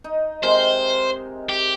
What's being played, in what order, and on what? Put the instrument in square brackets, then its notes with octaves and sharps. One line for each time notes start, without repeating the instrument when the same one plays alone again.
[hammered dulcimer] D#4
[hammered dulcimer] C3 G#3 A#4 [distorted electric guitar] C5
[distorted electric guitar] G4